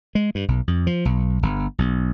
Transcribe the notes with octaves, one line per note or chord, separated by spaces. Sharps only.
G#3
G2
B1
F2
F3
B1
G1
B1